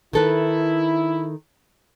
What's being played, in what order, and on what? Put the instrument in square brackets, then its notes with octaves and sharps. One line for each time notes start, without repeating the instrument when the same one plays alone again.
[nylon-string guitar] D#3 A4 B4 [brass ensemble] E4